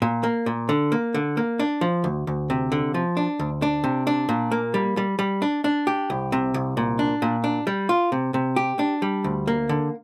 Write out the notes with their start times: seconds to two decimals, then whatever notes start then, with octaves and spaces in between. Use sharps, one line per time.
0.02 A#2
0.24 A#3
0.46 A#2
0.69 D3
0.92 A#3
1.14 D3
1.37 A#3
1.59 D4
1.81 F3
2.04 D2
2.27 D2
2.50 C3
2.72 D3
2.94 F3
3.17 D4
3.39 D2
3.62 D4
3.84 C3
4.07 D4
4.29 A#2
4.51 A#3
4.74 G3
4.97 G3
5.19 G3
5.42 D4
5.64 D4
5.87 G4
6.10 C2
6.32 C3
6.54 C2
6.77 A#2
6.99 D4
7.22 A#2
7.44 D4
7.67 G3
7.89 F4
8.12 C3
8.34 C3
8.56 G4
8.79 D4
9.02 G3
9.24 D2
9.47 A#3
9.69 D3